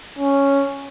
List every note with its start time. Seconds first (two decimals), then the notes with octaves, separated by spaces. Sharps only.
0.19 C#4